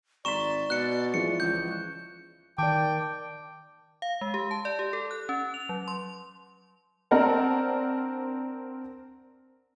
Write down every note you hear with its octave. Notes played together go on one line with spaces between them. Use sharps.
G#1 D5 A#5 C6 C#6 B6 E7 G7
B2 F#6 C#7
E3 F3 G#4 C#7
C#2 G6
D#3 D5 G5 A5 D6
F5
G#3
G4
A5
D5
G4
A4
F#6
C#4
F7
F#3
C6
C4 D4 A#4 C5 F#5 A5